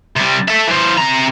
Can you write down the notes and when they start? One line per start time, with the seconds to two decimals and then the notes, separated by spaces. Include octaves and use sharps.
0.16 C3 G3
0.48 A4 E5
0.67 E3 C5
0.98 C3 A#5